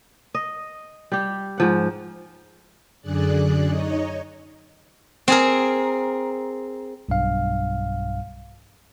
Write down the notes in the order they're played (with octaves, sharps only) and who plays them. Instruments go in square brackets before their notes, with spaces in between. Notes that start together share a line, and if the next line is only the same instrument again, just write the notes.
[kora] D#5
G3 G4
G#2 F3 F#5
[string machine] F#2 D3 G#4 D5 F#6
D#4 C#5 D#5
[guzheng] C4 G#4 A#4
[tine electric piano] B1 G2 F5